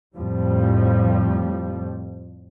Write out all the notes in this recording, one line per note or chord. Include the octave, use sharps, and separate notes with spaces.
F2 A2 F3 G3